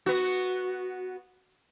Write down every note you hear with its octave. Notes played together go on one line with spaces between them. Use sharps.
B3 F#4